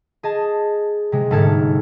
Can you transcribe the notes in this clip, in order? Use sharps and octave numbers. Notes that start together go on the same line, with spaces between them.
G#4 D#5 A5
C3 G#3
G1 G#2 A3 A4 F6 G#6